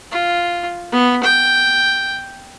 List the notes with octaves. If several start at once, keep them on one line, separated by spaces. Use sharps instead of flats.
F4
B3
G5